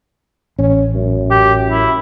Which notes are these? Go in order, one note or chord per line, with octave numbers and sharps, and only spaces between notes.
A1 C#4
F#2
G4
E4